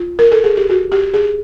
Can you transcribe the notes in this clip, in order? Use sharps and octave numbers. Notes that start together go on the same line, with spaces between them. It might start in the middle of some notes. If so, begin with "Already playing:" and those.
Already playing: F4
A#4
A4
G#4
G4
F#4
G4
G#4